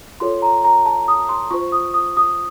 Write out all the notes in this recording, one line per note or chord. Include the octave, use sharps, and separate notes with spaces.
F4 A4 C#5 C6
A#5
A#5
A5
D#6
C6
F4 C5 C#6
D#6
D#6
D#6